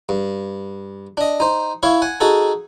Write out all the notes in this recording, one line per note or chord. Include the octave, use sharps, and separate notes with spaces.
G2
D4 D#5
D#4 C5
E4 C#5 F5
F#5 G#5
D#4 F#4 G#4 A4